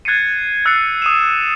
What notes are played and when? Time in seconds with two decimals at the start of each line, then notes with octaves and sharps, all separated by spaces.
0.05 F#6 G#6 A6 C7 C#7 D#7
0.66 E6 F#6 G#6 A6 C7 C#7
1.02 D#6 D#7 E7